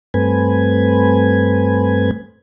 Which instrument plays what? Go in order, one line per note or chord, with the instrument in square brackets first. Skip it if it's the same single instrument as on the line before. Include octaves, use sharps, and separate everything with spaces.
[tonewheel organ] G2 A3 C4 B4 G#5